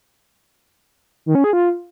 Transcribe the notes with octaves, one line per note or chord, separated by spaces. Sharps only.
D#3
C#4
G#4
F4